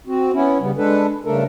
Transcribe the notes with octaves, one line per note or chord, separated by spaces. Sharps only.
C4 F#4
B3 C#4 E4
C#3 G3 B3
G#3 D4 A4 B4
G2 C#3 A3 D4 A4 A#4